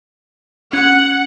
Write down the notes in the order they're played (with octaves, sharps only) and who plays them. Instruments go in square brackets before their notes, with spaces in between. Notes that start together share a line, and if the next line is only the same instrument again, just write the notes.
[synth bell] C#4 [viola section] F#5